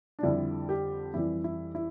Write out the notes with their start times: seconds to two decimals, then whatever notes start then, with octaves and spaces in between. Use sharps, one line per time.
0.19 D4
0.23 F2 D3 G3 E4
0.69 G4
1.14 F2 E3 G3 E4
1.44 E4
1.75 E4